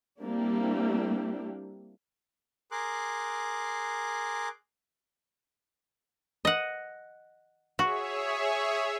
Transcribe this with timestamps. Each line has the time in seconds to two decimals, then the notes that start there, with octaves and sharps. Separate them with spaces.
0.21 G3 A#3 C4 D4 E4 G4
2.71 G#4 A#4 C6 D6 F#6
6.45 D#5 F#5
7.79 F#4 G#4 C#5 E5